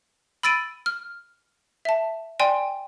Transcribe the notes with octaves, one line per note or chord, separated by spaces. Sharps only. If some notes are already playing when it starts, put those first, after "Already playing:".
B5 E6 A6 D7 D#7
F6
E5 A5
D5 G5 G#5 C6